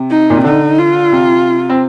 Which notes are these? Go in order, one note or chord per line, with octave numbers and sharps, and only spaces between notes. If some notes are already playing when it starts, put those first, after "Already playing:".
Already playing: C3
D#4
A#2
C3
D3 D#4
F4
C3
C4